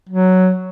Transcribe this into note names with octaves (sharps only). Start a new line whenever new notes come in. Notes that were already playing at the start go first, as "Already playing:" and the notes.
F#3